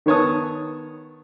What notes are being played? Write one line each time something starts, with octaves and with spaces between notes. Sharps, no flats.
D#3 B3 C#5 A5 D#6